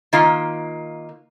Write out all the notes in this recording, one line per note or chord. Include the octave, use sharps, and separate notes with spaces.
D#3 A#3 F4